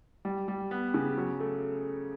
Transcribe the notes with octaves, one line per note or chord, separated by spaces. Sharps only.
G3
G3
B3
C#3
F#3
A3